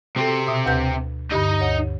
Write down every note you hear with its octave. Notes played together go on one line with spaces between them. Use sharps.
C3 C4 F#4 A4
B2 E5
D2 B4 G6
G2 D3 D#4 G4 D#5
D2 C#5